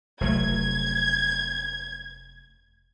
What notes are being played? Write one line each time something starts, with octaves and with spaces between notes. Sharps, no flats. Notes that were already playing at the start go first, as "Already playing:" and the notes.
F1 F#3 A3 G#6